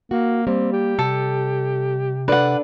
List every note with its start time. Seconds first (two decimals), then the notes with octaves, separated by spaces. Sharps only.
0.11 A#3 F#4
0.47 G3 A#3 C4
0.72 G4
0.99 C3 A4
2.28 D4 A4 B4 D5 F#5